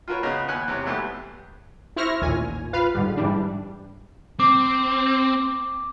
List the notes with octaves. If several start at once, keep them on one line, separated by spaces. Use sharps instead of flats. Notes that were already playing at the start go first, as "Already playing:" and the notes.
F4 F#4 A#4 B4 C#5
C#3 B3 D#5 A#5
D#2 B3 F#5 G#5 F#6
E2 C3 C#5
G#2 A3 B3 G4 G#4
E4 C5 C#6 F6 A#6
A1 D#2 A#2 G#5
F4 B4 F5
G#2 D3 G3
G#2 E3 G3 D4
C4 D6